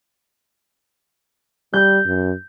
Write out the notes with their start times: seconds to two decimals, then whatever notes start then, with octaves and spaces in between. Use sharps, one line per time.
1.74 G3 G6
2.06 F#2